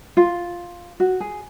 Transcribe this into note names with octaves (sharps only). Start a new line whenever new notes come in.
F4
F#4
G#4